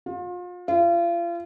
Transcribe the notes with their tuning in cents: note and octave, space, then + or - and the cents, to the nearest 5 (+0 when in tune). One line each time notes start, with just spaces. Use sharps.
F4 +35
F4 -35